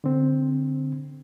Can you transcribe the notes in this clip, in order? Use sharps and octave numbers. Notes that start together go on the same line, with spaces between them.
D3 C4